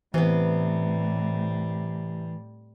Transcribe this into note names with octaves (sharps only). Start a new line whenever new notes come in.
A2 C3 E3 G3 B3